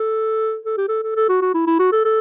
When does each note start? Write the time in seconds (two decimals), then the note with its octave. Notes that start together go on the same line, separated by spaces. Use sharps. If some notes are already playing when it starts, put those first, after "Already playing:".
Already playing: A4
0.65 A4
0.78 G4
0.88 A4
1.03 A4
1.16 A4
1.29 F#4
1.41 F#4
1.54 E4
1.67 E4
1.79 F#4
1.92 A4
2.05 A4